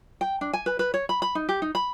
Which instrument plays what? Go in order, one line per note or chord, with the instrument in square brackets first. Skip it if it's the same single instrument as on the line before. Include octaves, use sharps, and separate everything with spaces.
[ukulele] G5
D4
G#5
B4
B4
C#5
B5
B5
D#4
G4
D#4
B5